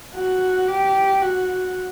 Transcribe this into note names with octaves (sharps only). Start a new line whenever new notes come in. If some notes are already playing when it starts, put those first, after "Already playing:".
F#4
G4
F#4